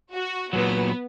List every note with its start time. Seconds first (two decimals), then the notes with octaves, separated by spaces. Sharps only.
0.12 F#4
0.53 A#2 F#3 B3